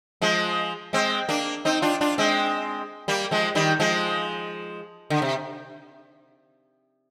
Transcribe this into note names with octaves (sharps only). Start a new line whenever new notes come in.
F3 G#3
G#3 C4
A#3 D4
C4 D#4
D4 F4
D4 F4
G#3 C4
G3 A#3
F3 G#3
D#3 G3
F3 G#3
D3
C3